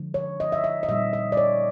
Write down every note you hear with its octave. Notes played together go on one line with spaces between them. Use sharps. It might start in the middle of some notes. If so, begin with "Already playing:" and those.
Already playing: D3 F3 G#3
C#5
D#5
E5
E5
D#5
A#2 G3 C4 D#4 E5
D#5
D5
C#5